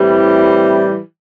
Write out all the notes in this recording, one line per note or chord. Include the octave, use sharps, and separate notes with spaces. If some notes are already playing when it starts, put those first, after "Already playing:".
Already playing: A2 E3 G3 C4 E4